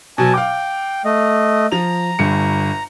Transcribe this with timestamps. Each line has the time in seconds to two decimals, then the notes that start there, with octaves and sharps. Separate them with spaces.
0.18 B2 F#3 G#5 A5
0.34 F5 G5 D6
1.05 A3 D#5
1.72 F3 A#5 F7
2.19 G1 G2 C#7